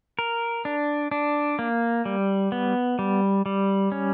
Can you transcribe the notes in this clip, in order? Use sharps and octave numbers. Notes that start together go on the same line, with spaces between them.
A#4
D4
D4
A#3
G3
B3
G3
G3
C#4